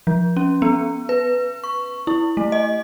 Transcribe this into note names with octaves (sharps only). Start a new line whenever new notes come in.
F3
C#4
B3
B4
C#6
E4
A3
D#5